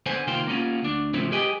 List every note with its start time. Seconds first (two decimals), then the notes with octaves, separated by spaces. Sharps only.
0.06 D3 B3 C5 G#5
0.27 C3 D#3 A#3 F4 C5 G5
0.47 A#3 B3 C#4 F4
0.82 D2 D4
1.14 A2 C#3 F3 C4 C#4 E4
1.32 G4 G#4 B4 D#5 G5 G#5